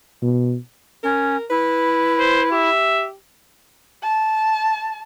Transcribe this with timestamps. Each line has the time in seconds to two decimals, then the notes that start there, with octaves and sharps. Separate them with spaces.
0.22 B2
1.03 C#4 A#4
1.50 E4 B4
2.19 C5
2.52 G4 E5
4.03 A5